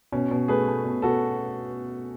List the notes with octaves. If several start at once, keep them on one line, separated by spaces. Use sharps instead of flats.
B2 C#4
B2
A3 G#4 B4
A3
B2
B2 F#4 A4